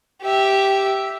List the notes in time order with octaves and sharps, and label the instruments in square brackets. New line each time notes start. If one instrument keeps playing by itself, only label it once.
[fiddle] G4 E5